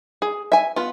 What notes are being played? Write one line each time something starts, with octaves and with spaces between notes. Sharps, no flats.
G#4
E5 G#5
B3 F4